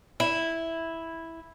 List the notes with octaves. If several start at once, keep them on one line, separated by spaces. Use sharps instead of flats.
E4